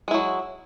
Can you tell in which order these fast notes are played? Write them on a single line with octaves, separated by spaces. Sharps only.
G#3 E4 F#3